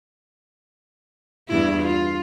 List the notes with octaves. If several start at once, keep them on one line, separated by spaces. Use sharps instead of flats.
E2 G2 E4
F4